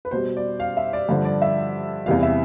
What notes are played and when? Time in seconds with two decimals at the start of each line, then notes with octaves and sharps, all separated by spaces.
0.05 B4
0.11 B2 G3 C5
0.37 D5
0.60 F5
0.77 E5
0.93 D5
1.09 G2 D3 F3 C5
1.25 D5
1.42 E5
2.06 E2 C3 E3 G3 F5
2.22 E5